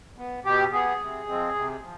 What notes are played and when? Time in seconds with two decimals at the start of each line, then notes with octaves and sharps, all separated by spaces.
0.18 B3
0.45 B2 G4
0.72 B3 G#4
0.99 C3
1.28 F3 G#3 C4
1.55 C3
1.82 F3